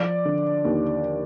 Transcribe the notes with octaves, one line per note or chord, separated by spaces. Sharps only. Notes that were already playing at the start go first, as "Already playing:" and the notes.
Already playing: F3 D5
D3
D#2